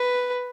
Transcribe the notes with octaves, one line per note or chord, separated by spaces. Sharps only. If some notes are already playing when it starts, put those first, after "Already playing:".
Already playing: B4